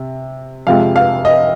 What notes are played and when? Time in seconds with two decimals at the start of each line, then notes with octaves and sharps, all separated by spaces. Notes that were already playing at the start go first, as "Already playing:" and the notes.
Already playing: C3
0.67 F2 C3 F3 G#3 F5
0.96 F5
1.25 D#5